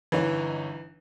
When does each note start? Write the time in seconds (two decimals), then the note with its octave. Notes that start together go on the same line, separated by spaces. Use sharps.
0.12 G1 E3 D#4 C#5